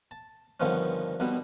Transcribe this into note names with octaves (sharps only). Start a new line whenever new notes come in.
A5
G2 D3 D#3 F3 B3 C#4
B1 B2 G3 B3